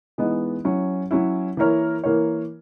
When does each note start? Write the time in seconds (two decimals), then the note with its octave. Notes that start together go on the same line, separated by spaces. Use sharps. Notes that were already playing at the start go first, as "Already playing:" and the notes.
0.18 E3 G#3 B3 D#4
0.64 F#3 C#4 E4
1.11 F#3 C#4 E4
1.57 E3 A#3 E4 A#4 C#5
2.04 E3 A#3 E4 A#4 C#5